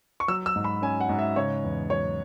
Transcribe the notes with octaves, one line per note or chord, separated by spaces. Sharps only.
C#6
F#3 E6
E6
G#2
B5
C#4 G#5
F#5
G#2
E5
C#3 C#5
E2
F#3 C#5